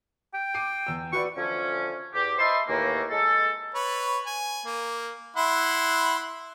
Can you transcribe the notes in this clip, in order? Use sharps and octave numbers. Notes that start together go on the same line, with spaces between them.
G5
D6 C7 D#7
E2 E6
F#4 B4 D5 C#6
D3 F3 A3 C#4
E2 G4
C5 D#5 E5 A5 B5 C6
D#2 A2 E3 A3 A#3
G#3 A4
B4 C#5
G#5
A#3
E4 F#5 C6